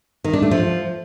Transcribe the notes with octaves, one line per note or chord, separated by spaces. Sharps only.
D#3
D4
A3
F3